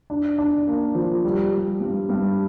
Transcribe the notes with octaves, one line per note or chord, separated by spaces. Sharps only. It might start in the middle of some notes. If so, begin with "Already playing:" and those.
D4
D4
A#3
F3
G3
G3
G2
G2